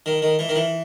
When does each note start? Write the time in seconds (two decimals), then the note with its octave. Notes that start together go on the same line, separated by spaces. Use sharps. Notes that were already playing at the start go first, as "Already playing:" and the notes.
0.06 D#3
0.22 D#3
0.39 E3
0.49 D#3
0.56 E3